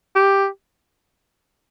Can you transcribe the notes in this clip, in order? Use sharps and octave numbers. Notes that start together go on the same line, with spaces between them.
G4